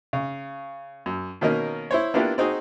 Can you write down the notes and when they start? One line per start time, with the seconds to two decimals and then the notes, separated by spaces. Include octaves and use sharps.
0.13 C#3
1.06 F#2
1.41 B2 D#3 A#3 C#4 A#4 D#5
1.91 E4 C5 C#5
2.14 A#3 B3 D4 E4 F4 G4
2.38 C4 D#4 F#4 G#4